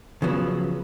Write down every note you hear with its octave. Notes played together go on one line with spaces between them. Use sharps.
C#3 F3 F#3 B3